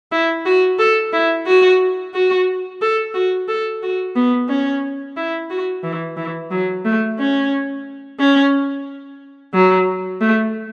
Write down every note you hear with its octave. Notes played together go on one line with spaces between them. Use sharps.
E4
F#4
A4
E4
F#4
F#4
A4
F#4
A4
F#4
B3
C#4
E4
F#4
E3
E3
F#3
A3
C#4
C#4
F#3
A3